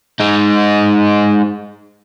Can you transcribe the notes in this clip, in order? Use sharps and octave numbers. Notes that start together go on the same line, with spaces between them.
G#3 D#4